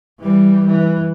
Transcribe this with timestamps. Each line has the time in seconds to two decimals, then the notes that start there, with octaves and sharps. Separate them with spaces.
0.19 E3 G3
0.65 E3